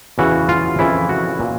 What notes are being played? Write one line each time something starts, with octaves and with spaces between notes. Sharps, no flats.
E2 C#3 E3 F#4
F4
F2 C#3 E3 E4
F#4
A#2